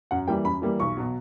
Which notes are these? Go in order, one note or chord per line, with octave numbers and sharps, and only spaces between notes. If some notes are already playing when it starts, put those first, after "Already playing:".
F#2 F#5
E3 G3 A#3 G5
F#2 B5
E3 G3 A#3
B1 C#6
B2 F#3